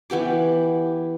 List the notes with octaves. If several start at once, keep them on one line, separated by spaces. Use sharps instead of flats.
E3 B3 G4 D6